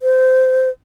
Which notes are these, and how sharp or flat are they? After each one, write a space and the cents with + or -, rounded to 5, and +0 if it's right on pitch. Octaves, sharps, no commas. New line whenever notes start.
C5 -20